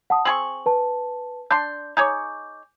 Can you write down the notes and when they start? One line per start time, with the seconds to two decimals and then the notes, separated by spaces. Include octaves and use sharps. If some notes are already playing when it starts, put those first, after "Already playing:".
0.10 F#5 A5 D#6
0.25 C4 G#4 C#6 F#7
0.66 B4 A5
1.51 D4 C6 G6
1.97 D#4 G#4 C#5 D6 G6